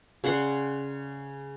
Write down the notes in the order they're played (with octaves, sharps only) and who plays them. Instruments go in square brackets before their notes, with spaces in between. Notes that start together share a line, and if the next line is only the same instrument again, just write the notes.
[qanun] C#3 D5 F#5 C6